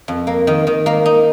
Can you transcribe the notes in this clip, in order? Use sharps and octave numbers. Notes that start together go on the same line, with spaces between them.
F2
A#3
D#3
D#3
A#3
D#4